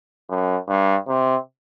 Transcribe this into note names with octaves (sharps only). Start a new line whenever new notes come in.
F#2
G2
C3